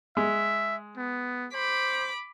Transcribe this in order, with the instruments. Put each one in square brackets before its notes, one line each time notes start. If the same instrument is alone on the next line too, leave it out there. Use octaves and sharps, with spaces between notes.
[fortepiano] G#3 [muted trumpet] E5
[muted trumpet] B3
[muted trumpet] C5 [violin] B5 D6